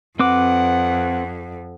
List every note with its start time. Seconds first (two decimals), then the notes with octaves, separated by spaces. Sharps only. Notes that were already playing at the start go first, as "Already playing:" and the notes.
0.20 F2 C4 B4 F#5 D6